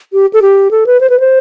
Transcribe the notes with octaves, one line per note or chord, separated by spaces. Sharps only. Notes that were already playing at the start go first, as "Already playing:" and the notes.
G4
A4
G4
A4
B4
C5
B4
C5